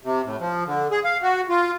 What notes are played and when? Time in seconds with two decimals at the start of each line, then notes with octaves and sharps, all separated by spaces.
0.04 C3
0.24 A2
0.40 F3
0.66 D3
0.91 G#4
1.04 F5
1.22 F#4
1.49 F4